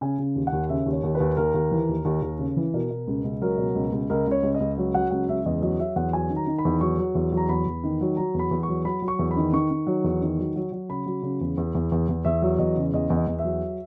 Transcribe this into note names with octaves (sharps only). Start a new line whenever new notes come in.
C#3 G#5
C#3
D#2
F#5
D#2
C#3 E5
D#2
C#5
D#2
B4
D#2
D#2 A#4
D#2
E3
D#2
D#2
D#2
C#3
E3
B2 A#4
B2
C#2
C#2
F#3 A#4
B2
C#2
C#2
C#2 A#4
C#2 C#5
C#2
D#5
C#2
F#3
F#3 F#5
C#2 F#5
C#2 E5
E2 D#5
F#3 D#5
F#3 E5
E2 F#5
F#3 G#5
D#3
A#5
D#3
B5
E2
F#3 C#6
F#3
E2
F#3
A#5
E2 B5
E2
D#3
F#3
F#3 A#5
E2
B5
E2
C#6
F#3
F#3 B5
F#3
C#6
E2
B5
D#3
D#3 C#6
D#3
F#3
E2
D#3
F#3
F#3
F#3
C#3 B5
F#3
C#3
E2
E2
E2
E2
E2
E2 E5
F#3
E2 D#5
C#3
E2 D#5
E2
D#5
E2
E5
F#3